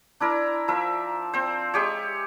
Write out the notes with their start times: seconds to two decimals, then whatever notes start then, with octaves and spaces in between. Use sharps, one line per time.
0.20 D4 E4 A#4
0.68 F3 A#4 E5
1.33 C4 C5
1.74 G#3 G4 C#5